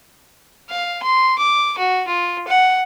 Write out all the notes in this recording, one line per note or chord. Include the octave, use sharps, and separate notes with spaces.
F5
C6
D6
F#4
F4
F#5